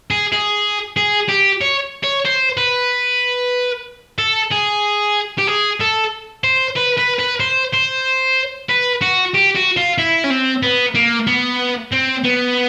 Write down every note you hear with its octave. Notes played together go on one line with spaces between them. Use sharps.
G#4
G#4
G#4
G4
C#5
C#5
C5
B4
A4
G#4
G4
G#4
A4
C5
B4
B4
B4
C5
C5
B4
F#4
G4
F#4
F4
E4
C#4
C4
B3
A#3
B3
C4
B3